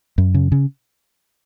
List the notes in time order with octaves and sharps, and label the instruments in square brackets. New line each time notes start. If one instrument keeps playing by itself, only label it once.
[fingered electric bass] F#2
C#3
C#3